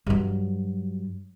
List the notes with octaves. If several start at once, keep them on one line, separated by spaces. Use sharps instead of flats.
G2 F#3